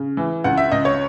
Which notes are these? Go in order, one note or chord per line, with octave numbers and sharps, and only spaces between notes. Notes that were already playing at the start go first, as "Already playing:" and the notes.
Already playing: C#3
E3
C#2 F#5
E5
C#2 D#5
C#5